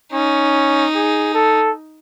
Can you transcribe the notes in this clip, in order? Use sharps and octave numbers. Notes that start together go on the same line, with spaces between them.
C#4 D#4
G#4
A4